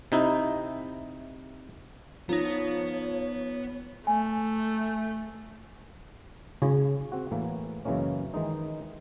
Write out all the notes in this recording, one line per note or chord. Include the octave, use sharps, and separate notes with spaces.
C3 D#4 E4
F3 B3 D#4 C#5 A#5
A3 G#5
C#3
C4 F#4
A2 E3 A#3
F#2 C#3 E3 G#3 A#3 C#4
D#3 E3 G#3 D#4